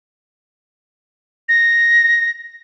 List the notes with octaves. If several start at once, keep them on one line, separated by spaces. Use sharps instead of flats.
A#6